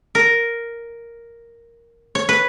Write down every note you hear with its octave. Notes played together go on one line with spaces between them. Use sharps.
A#4
C#5
B4